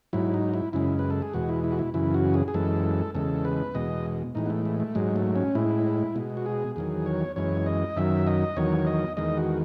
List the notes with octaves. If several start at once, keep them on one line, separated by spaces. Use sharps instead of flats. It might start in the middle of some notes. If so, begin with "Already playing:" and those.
G#2 F#3 E4
D#4
E4
F#2 C#3 G#3 E4
B4
A4
G#4
E2 B2 G#3 F#4
E4
E4
F#4
E4
F#2 C#3 E3 E4
F#4
G#4
G#4
F#2 E3 G#3 A4
E2 C#3 G#3 A4
B4
E2 B2 G#3 D#5
A2 E3 G#3 D#4
B3
A3
A3
A3
G#2 F#3 G#3
A3
C#4
A2 G#3 E4
B2 G#3
F#4
G#4
E2 D#3 F#3 G#4
C#5
F#2 E3 G#3 C#5
D#5
F#2 D#3 F#3 E5
D#5
E2 D#3 F#3 C#5
D#5
E2 D#3 G#3 D#5
F#4